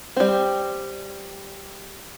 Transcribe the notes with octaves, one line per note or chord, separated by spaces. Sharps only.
G3 C4